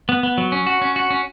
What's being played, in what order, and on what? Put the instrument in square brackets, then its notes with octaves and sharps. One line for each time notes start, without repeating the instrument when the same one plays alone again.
[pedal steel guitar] B3
B3
F#3
C#4
F#4
C#4
F#4
C#4